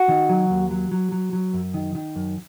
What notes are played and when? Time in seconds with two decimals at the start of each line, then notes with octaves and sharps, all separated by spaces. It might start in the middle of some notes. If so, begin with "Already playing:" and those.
Already playing: F#4 F#5
0.09 D#3
0.29 F#3
0.50 D#2
0.71 F#3
0.92 F#3
1.12 F#3
1.33 F#3
1.54 F#2
1.74 D#3
1.95 D#3
2.16 F#2